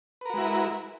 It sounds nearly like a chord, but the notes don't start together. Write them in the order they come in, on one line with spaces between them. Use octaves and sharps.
B4 A#4 F#4 G#3 E4